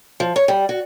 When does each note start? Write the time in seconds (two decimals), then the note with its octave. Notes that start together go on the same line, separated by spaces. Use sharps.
0.20 F3
0.36 C#5
0.48 G3
0.69 F#4